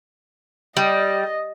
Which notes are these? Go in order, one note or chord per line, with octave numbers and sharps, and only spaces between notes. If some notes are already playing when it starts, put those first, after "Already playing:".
G3 D#5